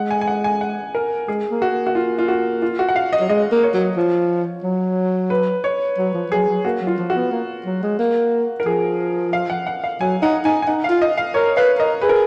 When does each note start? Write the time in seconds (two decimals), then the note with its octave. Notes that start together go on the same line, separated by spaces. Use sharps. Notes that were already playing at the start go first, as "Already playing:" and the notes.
Already playing: G#3 F#5
0.11 G#5
0.21 G#5
0.27 F#5
0.44 G#5
0.61 F#5
0.95 A#4
1.28 G#3 G#4
1.51 A#3
1.62 F#4
1.72 A#3
1.87 F#4
1.95 F4
2.19 F4
2.28 F#4
2.62 F4
2.79 F#4
2.89 F#5
2.96 F5
3.13 D#5
3.20 F#3
3.29 G#3 D#5
3.52 A#3
3.63 C#5
3.74 F#3
3.97 F3
4.63 F#3
5.30 B4
5.64 C#5
5.98 F#3
6.14 F3
6.31 F#3 G#4
6.48 F#3
6.65 A#3 F#4
6.82 F#3
6.87 F4
6.98 F3
7.10 F#4
7.15 B3
7.31 A#3
7.66 F#3
7.83 G#3
7.99 A#3
8.60 A#4
8.65 F3 G#4
9.33 F5
9.50 F#5
9.67 F#5
9.84 F5
10.01 F#3 G#5
10.22 D#4 F#5
10.45 D#4 G#5
10.62 G#5
10.67 D#4 F#5
10.84 F5
10.89 F4
11.02 D#5
11.17 F5
11.34 A#4 C#5
11.57 B4 F5
11.79 A#4 D#5
12.01 G#4 B4
12.09 A#4